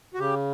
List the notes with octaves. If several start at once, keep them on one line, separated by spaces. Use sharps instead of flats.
F#4
C#3 G4